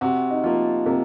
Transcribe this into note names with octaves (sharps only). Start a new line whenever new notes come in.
C3 F#4
D#4
F3 A#3 F4
C3 A#4